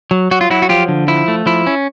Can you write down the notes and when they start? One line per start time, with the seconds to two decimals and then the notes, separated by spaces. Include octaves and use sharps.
0.11 F#3
0.31 F#3 F#4
0.41 F4
0.50 F#3 E4 F#4
0.62 F#4
0.69 F3 F4 G4
0.88 D3
1.08 F3 E4
1.28 A3
1.46 F3 E4
1.67 C#4